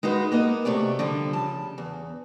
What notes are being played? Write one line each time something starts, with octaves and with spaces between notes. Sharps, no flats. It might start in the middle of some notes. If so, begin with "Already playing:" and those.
G#3 D#4 F4 F#4 B4
A#3 B3 D#5
C3 A3 F#4 D5
D3 F3 G3
C#3 A5
E2